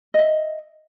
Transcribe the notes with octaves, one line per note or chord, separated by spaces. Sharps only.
D#5 E5